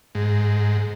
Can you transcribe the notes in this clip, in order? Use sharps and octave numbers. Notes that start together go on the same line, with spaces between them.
G#2